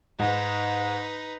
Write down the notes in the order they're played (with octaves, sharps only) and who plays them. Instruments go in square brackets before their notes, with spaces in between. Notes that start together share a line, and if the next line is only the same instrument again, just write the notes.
[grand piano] G#2 [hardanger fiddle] D#4 B4